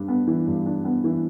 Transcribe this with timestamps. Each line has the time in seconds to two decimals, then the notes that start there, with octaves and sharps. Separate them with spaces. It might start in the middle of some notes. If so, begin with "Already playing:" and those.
Already playing: G2 D4
0.08 B3
0.27 E3
0.47 G2
0.66 D4
0.85 B3
1.04 E3